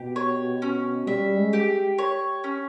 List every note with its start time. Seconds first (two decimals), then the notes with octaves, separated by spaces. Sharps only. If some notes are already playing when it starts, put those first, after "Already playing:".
Already playing: B2 G4
0.16 C#5
0.62 C#4
1.07 G3 E5
1.37 G#3
1.53 G4
1.98 C#5
2.44 C#4